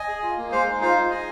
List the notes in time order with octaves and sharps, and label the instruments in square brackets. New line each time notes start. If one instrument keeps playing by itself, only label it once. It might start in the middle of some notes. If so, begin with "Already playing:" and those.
Already playing: [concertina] D#5 G#5
G#4
F4
A#3
G#3 C5 F5
D#4
F4 C5 F5
F4
G#4 D#5 G#5